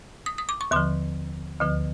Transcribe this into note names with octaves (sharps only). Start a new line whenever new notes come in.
D#6
D#6
D6
C#6
D#2 D3 F3 C6
D2 D3 F3